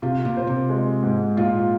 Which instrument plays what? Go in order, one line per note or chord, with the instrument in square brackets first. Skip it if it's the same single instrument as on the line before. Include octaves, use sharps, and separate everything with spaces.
[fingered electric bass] C3 [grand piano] F4
[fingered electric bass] A#2
[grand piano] C5
[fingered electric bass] C3
[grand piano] G#3
G#2
[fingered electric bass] A#2 [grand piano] F4